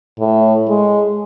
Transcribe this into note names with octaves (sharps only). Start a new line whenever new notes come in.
A2
G#3